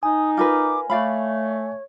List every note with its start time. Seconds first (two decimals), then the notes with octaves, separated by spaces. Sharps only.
0.03 D#4 G#5 D#6
0.37 F4 A#4 B4 D6
0.90 A3 C#5 D5 F5 B5